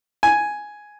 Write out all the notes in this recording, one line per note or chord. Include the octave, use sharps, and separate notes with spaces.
G#5